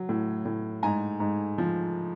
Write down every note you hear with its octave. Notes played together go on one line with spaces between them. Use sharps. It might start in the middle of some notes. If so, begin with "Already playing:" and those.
Already playing: F#3
A2
A2
G#2 G#5 A#5
G#2
F3